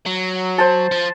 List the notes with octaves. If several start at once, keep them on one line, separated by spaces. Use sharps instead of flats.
F#3
C5 A5
F3